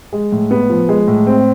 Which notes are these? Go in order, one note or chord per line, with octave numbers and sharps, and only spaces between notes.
G#3
A2
B3
F3
G#3
A2
C4